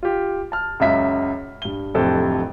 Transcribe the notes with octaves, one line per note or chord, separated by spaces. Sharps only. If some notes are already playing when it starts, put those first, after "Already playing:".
F4 G4
A5 F6
C#2 F#2 E5 B6
G2 G7
D1 F2 C3 A4